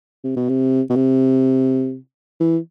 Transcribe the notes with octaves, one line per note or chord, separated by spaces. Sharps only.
C3
B2
C3
B2
C3
E3